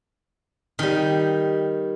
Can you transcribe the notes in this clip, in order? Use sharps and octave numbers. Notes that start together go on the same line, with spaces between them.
D#3 G3